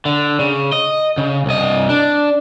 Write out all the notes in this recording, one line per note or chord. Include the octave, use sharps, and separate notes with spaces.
D3
C#3
D#5
C#3
C2 D#5
D4